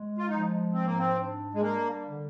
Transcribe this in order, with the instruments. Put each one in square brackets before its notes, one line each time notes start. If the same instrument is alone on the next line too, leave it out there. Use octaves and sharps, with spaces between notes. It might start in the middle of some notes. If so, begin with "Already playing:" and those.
Already playing: [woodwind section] G#3
[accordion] F4
[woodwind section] F3 [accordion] D#4
[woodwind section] G#2 [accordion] C4
[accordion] A#3
C4
[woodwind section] D4
[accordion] G#3
[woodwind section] G3 [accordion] A#3
[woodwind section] D3